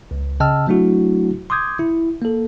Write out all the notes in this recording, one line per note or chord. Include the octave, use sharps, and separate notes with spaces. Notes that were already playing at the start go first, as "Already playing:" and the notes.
C#2
C#3 D#5 G5 A5 E6 F6
F#3 A3 D4 E4 F#4
C6 D6 D#6 G6 G#6
E4
A#3 A4